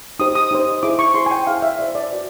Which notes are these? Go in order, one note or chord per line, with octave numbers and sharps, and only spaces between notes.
D#4 G4 C5 D#6
D#6
D#4 G4 C5
E4 G#4 C5 D6
C#6
E4 G#4 C5 C6
G#5
G5
E4 G#4 C5 F5
E5
E4 G#4 C5 D5
D5
F#4 B4